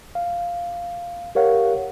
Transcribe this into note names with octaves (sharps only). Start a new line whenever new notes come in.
F5
G4 A#4 C#5 F5 F#5